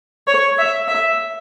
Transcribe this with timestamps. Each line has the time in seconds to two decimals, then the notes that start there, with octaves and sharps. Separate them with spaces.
0.28 C#5
0.58 E5
0.88 E5